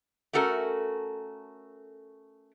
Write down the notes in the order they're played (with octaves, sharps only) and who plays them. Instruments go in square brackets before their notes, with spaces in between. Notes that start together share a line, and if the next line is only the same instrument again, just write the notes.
[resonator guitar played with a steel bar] A3 C#4 F#4 A4 A#4